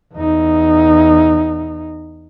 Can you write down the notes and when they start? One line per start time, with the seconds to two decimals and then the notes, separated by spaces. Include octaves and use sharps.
0.15 E2 D#4